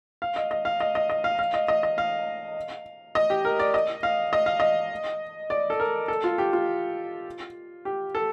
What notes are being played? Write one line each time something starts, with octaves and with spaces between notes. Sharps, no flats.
F5
D#5
D#5
F5
D#5
D#5
D#5
F5
F5
D#5
D#5
D#5
F5
D#5
G4
A#4
D5
D#5
F5
D#5
F5
D#5
D5
A4
A#4
A4
F4
G4
F4
G4
A4